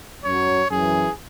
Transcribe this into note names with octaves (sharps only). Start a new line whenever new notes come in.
F#2 F#3 C#5
F#2 E3 G#4